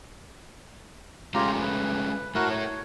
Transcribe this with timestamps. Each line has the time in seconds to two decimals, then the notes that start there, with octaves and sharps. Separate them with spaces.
1.35 G#3 A3 C#4 F4 G4 A#5
1.61 B4
2.35 A3 E4 F#4 A#4 F#6
2.51 C#5